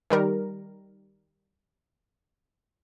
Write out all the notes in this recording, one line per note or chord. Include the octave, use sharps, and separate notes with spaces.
D#3 G3 A#4